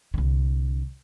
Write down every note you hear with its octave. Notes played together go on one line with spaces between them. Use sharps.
C2 D3